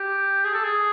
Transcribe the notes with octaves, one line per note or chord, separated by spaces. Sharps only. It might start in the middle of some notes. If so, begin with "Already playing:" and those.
Already playing: G4
G#4
A4
G#4